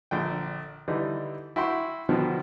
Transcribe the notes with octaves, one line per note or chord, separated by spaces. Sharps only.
A#1 D3 G5
D3 E3 G3 D#4
E4 F#4 G5 C6 C#6
B2 D3 D#3 F3 B3